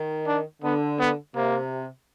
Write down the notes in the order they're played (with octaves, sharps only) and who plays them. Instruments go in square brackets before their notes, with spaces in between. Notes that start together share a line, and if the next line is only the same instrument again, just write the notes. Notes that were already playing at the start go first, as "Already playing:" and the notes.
Already playing: [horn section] D#3
[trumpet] D4
[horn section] D3 [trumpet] B3
[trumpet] B3
[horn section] C3 [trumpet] A#3